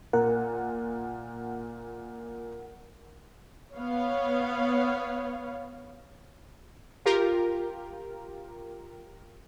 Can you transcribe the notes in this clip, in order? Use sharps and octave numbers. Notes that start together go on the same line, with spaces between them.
A#2 A#4 F#5
B3 C#5 F5
F4 G4 A#4